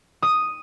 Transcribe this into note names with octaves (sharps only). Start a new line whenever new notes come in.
D#6